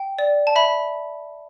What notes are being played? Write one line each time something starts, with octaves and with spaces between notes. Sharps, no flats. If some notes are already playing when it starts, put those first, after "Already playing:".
Already playing: G5
D5
A5
E5 B5